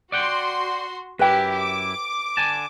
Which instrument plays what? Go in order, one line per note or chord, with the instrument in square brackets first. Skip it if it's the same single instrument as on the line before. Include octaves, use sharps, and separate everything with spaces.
[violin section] F#4 C6 [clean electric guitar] D5 F#5 G5
[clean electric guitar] F#2 E4 [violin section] G4 [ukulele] B4 G5
[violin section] D6
[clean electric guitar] D3 G#5 A5